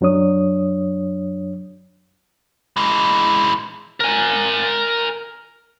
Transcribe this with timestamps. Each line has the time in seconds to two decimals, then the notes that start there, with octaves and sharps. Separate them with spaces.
0.01 F#2 F#3 D4 C#5 D#6
2.77 E3 G#3
4.00 A#4 G#5